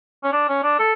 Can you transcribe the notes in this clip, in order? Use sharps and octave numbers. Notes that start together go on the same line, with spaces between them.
C#4
D4
C#4
D4
A4